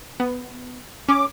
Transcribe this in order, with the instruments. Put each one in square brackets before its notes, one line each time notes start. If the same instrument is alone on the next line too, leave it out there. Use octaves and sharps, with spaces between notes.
[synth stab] B3
[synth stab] C#4 [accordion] D6